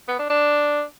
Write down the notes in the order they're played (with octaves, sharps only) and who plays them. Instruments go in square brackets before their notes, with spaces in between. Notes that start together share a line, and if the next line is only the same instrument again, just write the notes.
[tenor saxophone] B3
D4
D4